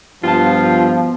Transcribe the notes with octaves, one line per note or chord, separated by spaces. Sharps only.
G2 B2 F3 F4 A5